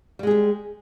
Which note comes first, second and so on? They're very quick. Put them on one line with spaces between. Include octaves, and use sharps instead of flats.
G3 G#3 G#4 G4